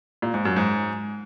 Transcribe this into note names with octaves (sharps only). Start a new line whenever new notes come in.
A#2
G#2
F#2
G#2